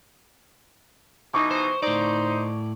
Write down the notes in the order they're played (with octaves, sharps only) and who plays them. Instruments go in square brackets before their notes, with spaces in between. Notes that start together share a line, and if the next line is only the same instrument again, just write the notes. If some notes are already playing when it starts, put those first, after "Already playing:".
[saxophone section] B2 E3 D#4 [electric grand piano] C#6 D6
[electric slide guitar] C5
[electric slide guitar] A2 D5 [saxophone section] D#4 C5